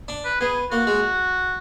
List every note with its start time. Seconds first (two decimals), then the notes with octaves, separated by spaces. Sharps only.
0.08 D4
0.25 B4
0.41 B3 G#4
0.72 A#3 F#4
0.87 G#3